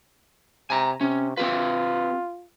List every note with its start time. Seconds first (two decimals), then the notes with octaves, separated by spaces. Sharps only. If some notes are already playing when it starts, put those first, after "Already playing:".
0.70 C3 G#5 A#5
1.01 C3 C#4
1.37 C4 F4 G4 B4